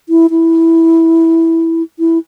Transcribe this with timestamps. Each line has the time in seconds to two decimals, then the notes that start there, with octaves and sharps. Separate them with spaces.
0.09 E4
0.30 E4
1.99 E4